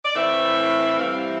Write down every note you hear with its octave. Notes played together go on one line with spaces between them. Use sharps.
D5
A2 E3 A3 C4 E5
C3 E3 G3 C4 F5
E5